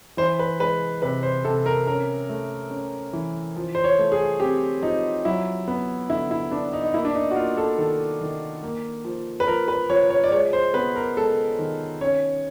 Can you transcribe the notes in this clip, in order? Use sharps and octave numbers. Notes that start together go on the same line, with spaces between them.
E3 C5
B4
G#3 B4
C3 B4
C5
C3 A4
A#4
C#4 A#4
A3
C#4
E3
F3
C5
C#5
A3
G#4
C4 G4
F3 D#4
F#3 E4
B3
D3 E4
E4
B3 D4
D#4
D#4
A#3 E4
D4
D#4
F#4
A#3 F4
A4
D#3 A4
D#3
A#3
F3
B4
F3 A#4
B4
F3 C#5
C#5
D5
G#3 C#5
C5
B3 B4
A#4
G#3 A4
D#3
C#4 C#5